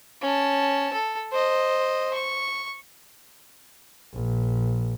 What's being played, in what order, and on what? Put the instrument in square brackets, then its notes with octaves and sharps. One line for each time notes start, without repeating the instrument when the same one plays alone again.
[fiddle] C#4 A5
A4
C5 D#5
C#6
[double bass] A#1